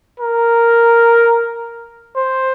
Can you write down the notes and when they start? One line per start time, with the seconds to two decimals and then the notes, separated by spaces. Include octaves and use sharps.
0.20 A#4
2.16 C5